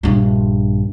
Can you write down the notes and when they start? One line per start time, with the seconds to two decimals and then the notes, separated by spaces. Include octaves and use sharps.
0.03 A#1 G2